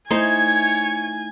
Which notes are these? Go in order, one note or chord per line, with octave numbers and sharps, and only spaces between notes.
A3 D#4 E4 C5 C#5 G#5